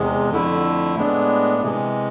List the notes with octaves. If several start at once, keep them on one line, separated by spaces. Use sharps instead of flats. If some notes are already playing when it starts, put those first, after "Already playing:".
Already playing: E2 C3 G#3
F2 D3 A3 E4
A2 G#3 B3 D4
C3 E3 G#3